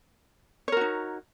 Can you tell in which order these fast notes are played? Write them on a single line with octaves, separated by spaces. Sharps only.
C#5 A#4 F#4 D#4